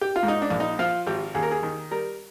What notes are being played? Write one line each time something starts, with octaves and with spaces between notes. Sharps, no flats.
G4
F4
G#2
D#4
D4
A#1
D#4
F3 F4
G#1 G4
D#2 G#4
A#4
G#4
D#3
G3 A#4